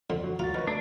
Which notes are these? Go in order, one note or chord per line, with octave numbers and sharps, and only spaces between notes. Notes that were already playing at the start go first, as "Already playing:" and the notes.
F2 D3 C6
F#3
D2 F4 F#4 A#5 A6
D#3 A#4 B4 C#5
A3 D4 D5